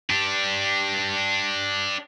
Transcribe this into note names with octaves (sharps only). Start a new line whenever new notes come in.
D4 G4